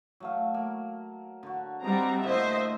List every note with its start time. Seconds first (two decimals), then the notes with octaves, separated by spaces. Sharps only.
0.20 F#3 A3 F5
0.54 A#3
1.43 D3 F#4
1.84 G3 C4 D#5 F#5 A#5
2.23 A2 D3 A#3 C5 D#5 E5